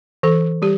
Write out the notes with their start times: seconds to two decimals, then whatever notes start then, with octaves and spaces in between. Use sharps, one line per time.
0.23 E3 A4
0.62 G3 G4